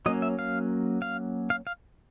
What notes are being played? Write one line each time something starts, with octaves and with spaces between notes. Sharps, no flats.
F#3 A#3 C#4 D#5
E5
F5
F5
F5
F5